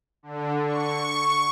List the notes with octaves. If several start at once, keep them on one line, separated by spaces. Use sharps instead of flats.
D3
C#6